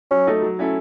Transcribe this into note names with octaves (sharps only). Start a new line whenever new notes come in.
F#3 C#4
A3 D#4 A4
F#3
A3 C#4 E4 A4